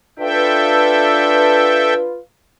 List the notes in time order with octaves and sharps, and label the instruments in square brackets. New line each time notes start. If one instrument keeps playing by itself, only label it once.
[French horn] D4 [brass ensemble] F4 B4 [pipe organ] A4 E5 G5